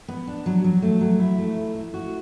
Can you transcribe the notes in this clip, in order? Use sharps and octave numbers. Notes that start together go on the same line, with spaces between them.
B3
D4
F#3
F#3
A3
F#3
E4
A3
E4
E4
F#4